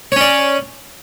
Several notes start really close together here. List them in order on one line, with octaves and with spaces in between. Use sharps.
C#5 C#4 D5